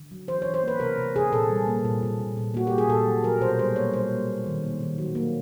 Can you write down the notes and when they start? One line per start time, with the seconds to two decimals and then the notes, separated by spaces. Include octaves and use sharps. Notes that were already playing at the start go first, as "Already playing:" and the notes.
Already playing: D3
0.11 F#3
0.28 E3 C5
0.42 E3 C#5
0.54 C5
0.63 A#3 B4
0.80 C3 A#4
0.98 C3
1.16 C3 G#4
1.32 A#2 A4
1.50 G3
1.67 A#3
1.85 A#2
2.03 A#2
2.20 A#2
2.37 A#2
2.54 A#3 F#4
2.67 G4
2.72 A#3
2.78 G#4
2.89 A#2 A4
3.07 F#3
3.24 F#3 A#4
3.41 B2 C5
3.58 G3 C5
3.76 A#3 C#5
3.93 G3 C5
4.11 A#3
4.29 A#3
4.46 D#3
4.64 A#3
4.81 D#3
4.98 F#3
5.15 A#3